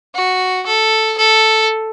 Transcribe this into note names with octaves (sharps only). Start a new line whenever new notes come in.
F#4
A4
A4